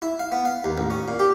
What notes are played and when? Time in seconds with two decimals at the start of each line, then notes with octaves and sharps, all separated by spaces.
0.02 E4
0.19 F5
0.32 B3
0.45 F5
0.64 D#2
0.78 A1
0.90 C#4
1.08 A#2
1.19 G4